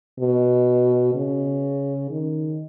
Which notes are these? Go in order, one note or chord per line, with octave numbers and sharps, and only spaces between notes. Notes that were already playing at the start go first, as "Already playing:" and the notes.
B2
C#3
D#3